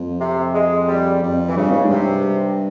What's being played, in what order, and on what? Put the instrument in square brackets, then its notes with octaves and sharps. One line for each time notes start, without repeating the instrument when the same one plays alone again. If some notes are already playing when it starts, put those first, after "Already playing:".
Already playing: [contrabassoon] F2
[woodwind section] C3
G#3
G3
[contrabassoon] F2
[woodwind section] E3
[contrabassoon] G2 [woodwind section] C#3
[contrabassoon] G#2
G2
[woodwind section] C3